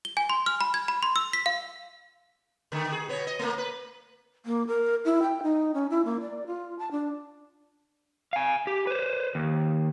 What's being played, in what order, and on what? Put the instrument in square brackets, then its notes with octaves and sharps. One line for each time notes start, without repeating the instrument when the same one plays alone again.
[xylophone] G7
G#5
C6
F6
B5
G#6
B5
C6
E6
B6
F5
[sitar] D3 D#3 A3
G#4
B2 B3 C#5
D#5
A3 A#3
B4
[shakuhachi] A#3
A#4
E4
G5
D#4
C#4
E4
A#3
D5
F4
A5
D4
[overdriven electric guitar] F5 G#5
G4
B4 C5
D#2